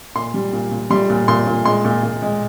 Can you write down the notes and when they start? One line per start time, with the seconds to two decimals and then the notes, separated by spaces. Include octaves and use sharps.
0.15 A#2 C6
0.34 G3
0.53 A#2
0.71 A#2
0.90 G3 C6
1.10 A#2
1.28 A#2 C6
1.47 A#2
1.65 G#3 C6
1.85 A#2
2.03 A#2
2.22 G#3